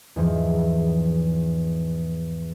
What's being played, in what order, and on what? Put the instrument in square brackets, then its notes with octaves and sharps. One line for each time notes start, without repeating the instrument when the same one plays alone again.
[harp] E2 G#2 E3 F3